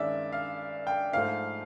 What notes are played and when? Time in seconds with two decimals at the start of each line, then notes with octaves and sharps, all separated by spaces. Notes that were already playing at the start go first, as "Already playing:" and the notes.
Already playing: G2 D#3 G#3 C#4 D5 E5
0.32 F5
0.87 G5
1.13 G#2 F3 A3 F5